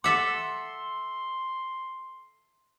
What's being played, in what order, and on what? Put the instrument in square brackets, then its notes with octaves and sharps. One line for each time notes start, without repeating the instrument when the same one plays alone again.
[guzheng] A4 E5 F#5 [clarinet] C6 [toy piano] D6